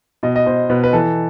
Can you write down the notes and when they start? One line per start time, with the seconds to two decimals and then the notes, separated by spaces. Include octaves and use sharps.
0.23 B2 D#5
0.36 D#5
0.46 B2 C5
0.70 B2 B4
0.84 B4
0.93 E3 A4